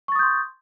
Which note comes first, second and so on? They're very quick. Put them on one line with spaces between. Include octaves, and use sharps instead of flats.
C#6 A6 D#6 G6 C6